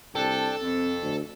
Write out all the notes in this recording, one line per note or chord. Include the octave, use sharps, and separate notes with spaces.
C2 D4 A4 G5
F2 C4
D2